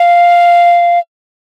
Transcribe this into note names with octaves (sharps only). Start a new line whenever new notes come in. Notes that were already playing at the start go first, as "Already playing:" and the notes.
Already playing: F5